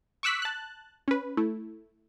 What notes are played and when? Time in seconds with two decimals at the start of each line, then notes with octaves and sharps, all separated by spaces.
0.23 C#6 D6 E6 F#6 B6
0.42 A5 F#6
1.08 C#4 B4
1.37 A3 E4